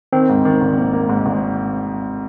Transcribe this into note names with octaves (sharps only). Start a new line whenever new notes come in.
D#3 C4
G#2
D#3
G#1
A#3
A#3
G#2
G#1